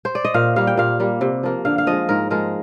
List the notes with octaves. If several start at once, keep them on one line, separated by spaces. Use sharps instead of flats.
C5
D5
D#5
A#2 F5
G3 A#3 F5
G5
A#2 F5
G3 A#3
C3
F3 A#3
D3 F5
F5
F3 G#3 D#5
G#2 A#4
F3 G#3 A#4